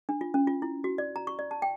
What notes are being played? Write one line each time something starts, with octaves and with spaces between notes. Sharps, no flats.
D4
F4
C#4
F4
E4
F#4
D5
A#5
C#6
D5
A5
G5